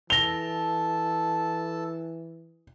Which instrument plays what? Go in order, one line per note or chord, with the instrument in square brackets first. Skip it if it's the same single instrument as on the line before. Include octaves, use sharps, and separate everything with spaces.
[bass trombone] E3 [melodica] A4 A5 [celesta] A#6 F7 [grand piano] G7